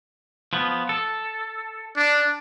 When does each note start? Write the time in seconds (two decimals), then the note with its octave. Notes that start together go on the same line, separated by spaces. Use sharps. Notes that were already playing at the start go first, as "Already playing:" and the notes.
0.53 F3 B3
0.89 A4
1.96 D4